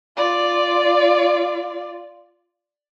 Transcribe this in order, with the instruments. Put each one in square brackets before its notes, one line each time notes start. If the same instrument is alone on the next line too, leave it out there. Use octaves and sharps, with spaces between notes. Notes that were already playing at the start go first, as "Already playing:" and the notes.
[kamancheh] F4 D5